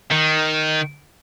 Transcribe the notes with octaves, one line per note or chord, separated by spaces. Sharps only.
D#3